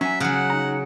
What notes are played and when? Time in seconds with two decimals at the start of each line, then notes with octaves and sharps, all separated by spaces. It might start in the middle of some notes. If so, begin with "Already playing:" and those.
0.01 F#3 C#4 E5 G#5
0.20 C#3 F#3 F#5
0.50 D#4 A#5